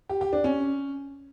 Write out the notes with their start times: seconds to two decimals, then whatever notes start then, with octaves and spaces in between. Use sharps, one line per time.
0.09 G4
0.21 G4
0.33 D4
0.44 C#4